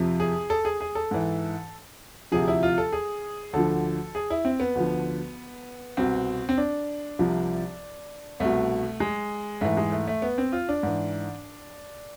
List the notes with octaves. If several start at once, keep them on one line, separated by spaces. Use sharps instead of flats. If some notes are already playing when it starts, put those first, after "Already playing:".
Already playing: F2 C3 F3
G#4
A4
G#4
G#4
A4
G#2 E3
D2 C3 F3 G#4
E4
F4
A4
G#4
D2 D3 F3 A4
G#4
E4
C4
B3
D2 D3 F3
C2 B2 C4
C4
D4
C2 C3 F3
C2 B2 A3
G#3
G#2 E3 A3
G#3
A3
A3
B3
C4
F4
D4
G#2 E3